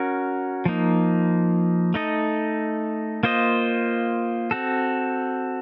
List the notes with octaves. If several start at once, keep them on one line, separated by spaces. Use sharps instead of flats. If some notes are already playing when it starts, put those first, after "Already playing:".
Already playing: C#4 F#4 A#4
F3 A#3 D#4
A3 D#4 A4 D#5
A#3 F4 C5 D#5
C4 F#4 A4